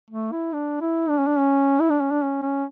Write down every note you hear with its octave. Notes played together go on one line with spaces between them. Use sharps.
A3
E4
D4
E4
D4
C#4
D4
C#4
E4
D4
C#4
D4
C#4
C#4